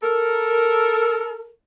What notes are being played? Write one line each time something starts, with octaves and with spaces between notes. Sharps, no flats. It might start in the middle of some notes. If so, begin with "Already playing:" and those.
A4 A#4